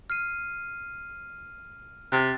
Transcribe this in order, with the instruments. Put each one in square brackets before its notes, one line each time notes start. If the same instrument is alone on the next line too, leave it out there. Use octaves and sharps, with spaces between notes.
[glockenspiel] F6 C7 D#7
[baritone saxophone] C3 [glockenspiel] F#6 A6